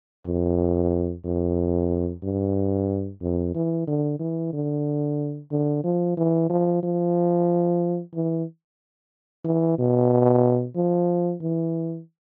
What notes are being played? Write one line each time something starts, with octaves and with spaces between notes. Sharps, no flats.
F2
F2
G2
F2
E3
D3
E3
D3
D3
F3
E3
F3
F3
E3
E3
B2
F3
E3